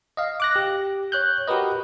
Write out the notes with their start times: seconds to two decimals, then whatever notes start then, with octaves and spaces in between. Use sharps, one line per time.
0.17 D#5 F5
0.40 D6 F#6 A#6
0.56 G4
1.12 C#5 F#6 G6
1.47 F#4 G4 A#4 B4 D#5